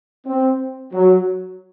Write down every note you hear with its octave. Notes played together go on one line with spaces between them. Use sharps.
C4
F#3